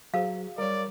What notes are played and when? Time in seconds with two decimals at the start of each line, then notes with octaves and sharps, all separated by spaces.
0.14 F#3 F#4 G#4 C5 F5
0.58 G3 A#4 C#5 D5